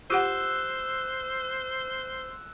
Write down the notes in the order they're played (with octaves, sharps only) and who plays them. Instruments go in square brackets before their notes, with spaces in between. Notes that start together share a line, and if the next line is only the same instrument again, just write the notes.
[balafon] F4 G4 F#5 [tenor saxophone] C5 [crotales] E6 F#6 E7